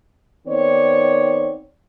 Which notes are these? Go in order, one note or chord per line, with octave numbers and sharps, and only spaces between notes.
D#3 B3 C4 C#5 D5